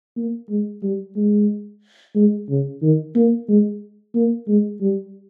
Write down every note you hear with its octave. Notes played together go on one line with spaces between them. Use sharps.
A#3
G#3
G3
G#3
G#3
C#3
D#3
A#3
G#3
A#3
G#3
G3